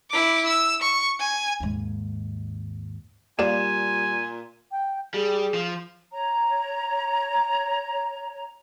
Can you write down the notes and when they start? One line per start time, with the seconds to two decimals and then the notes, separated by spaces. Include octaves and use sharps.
0.11 E4 D6
0.47 E6
0.82 C#6
1.20 G#5
1.60 D#2 G#2
3.39 A#2 G3 A#3 F4 D5 G#5 E7
4.72 G5
5.14 G3 G#4
5.54 F3
6.12 C#5 A#5